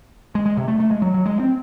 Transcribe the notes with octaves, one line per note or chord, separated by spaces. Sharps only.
G#3
G#3
C3
A3
A3
G#3
F#3
F#3
G#3
C4